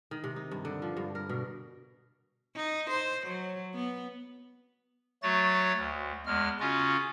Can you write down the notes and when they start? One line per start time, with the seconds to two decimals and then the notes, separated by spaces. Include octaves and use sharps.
0.11 D#3
0.24 C3
0.36 D#4
0.51 G2
0.65 D3
0.82 F3
0.97 G2
1.15 A#4
1.29 B2
2.56 D#4
2.91 C5
3.27 F#3
3.75 B3
5.23 F#3 A3 F#4 C#5 A6
5.77 D2
6.26 E2 G#3 F6
6.60 C#3 C#4 F4 F#4